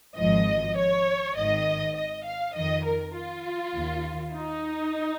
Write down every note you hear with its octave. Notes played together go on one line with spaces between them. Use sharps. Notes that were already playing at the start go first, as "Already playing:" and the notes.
G#1 G#2 F3 D#5
C#5
G#1 G#2 D#3 D#5
D#5
F5
F2 D#3 D#5
A#4
F4
D#2 D#3
D#4